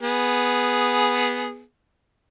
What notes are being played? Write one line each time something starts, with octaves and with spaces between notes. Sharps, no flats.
B3 G#4